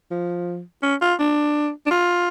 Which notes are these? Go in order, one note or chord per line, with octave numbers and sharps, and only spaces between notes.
F3
C#4
F4
D4
D4
F4